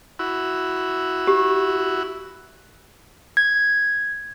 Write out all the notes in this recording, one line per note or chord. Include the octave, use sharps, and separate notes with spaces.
E4 F#4
G4
G#6